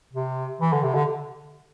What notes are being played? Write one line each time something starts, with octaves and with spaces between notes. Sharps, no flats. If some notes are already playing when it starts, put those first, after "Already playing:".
C3
E3
D3
C3
D3